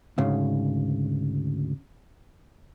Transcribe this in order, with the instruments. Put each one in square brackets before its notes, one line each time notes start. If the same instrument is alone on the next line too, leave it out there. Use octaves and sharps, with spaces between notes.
[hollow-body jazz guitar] D2 G#2 C#3